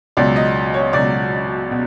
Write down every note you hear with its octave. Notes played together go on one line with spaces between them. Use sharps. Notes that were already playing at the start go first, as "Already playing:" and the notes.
C#2 B2 F#3 D5
D#5
C#5
C#2 B2 F#3 D5
B2